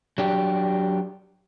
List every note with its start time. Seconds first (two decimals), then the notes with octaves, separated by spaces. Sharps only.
0.18 F#3 D4 G4